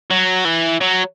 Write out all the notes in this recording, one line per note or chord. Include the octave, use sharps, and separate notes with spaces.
F#3
E3
F#3